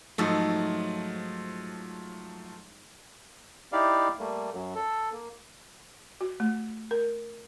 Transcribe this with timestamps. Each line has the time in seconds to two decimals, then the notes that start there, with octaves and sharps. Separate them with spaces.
0.18 G#2 F3 F#3 A3 A4
3.72 D#4 E4 G4 D5 F5
4.19 G3 A3 A#3
4.54 F#2 F#3
4.75 A4
5.13 A#3
6.21 F#4
6.40 A3
6.91 A#4